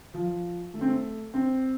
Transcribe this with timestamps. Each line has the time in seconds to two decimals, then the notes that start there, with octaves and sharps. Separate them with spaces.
0.14 F3
0.74 A3
0.81 C4
0.88 A3
1.34 C4